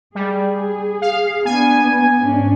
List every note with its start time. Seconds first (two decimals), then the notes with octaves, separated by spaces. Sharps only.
0.15 G3 G#4
1.02 F5
1.45 B3 D4 G#5
2.20 G#2 C#4 D4